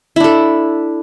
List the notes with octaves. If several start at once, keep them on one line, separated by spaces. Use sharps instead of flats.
D4 E4 A4